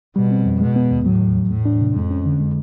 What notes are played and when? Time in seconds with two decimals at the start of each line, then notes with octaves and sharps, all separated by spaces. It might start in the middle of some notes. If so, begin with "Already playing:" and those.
0.16 B2 G3
0.31 C4
0.46 F2
0.61 B2 G#3
0.76 B3
0.91 D#2
1.06 A2 F#3
1.21 E2
1.36 E2
1.51 A2 A3
1.65 D4
1.81 C3
1.95 F2 G#3
2.11 C#4
2.26 D3
2.41 G#3